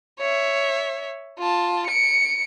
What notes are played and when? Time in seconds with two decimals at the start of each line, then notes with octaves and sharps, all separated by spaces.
0.19 C#5 E5
1.38 F4 A5
1.87 C#7 D7